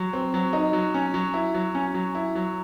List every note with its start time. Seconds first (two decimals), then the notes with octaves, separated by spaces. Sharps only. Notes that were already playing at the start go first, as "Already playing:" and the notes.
Already playing: F#3
0.13 C4
0.34 F#3
0.53 D#4
0.73 F#3
0.94 C#4
1.14 F#3
1.33 E4
1.54 F#3
1.75 C#4
1.94 F#3
2.15 E4
2.35 F#3